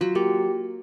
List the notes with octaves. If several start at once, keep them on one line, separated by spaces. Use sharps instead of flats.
F#3 F4
A#3 G4